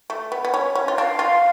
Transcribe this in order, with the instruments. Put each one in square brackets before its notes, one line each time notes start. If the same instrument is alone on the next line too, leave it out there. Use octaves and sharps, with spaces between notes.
[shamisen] A3
B3
B3
C#4
C#4
F4
[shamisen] D4 [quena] F5
[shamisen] F4